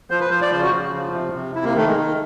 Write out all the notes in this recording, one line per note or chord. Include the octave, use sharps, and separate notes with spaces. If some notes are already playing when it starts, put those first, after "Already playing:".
F3 C5
B4
F3 C5
D5
C#3 C5
F#4
C#3
F3
C3
C3
C3 E4
A#3
D#3 A3
G#3
D#3